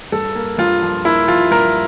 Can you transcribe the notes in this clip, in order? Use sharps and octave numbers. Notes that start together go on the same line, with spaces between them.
G2 A4
A#3
G2 F4
F3
A#3 E4
F3 F4
G2 A#4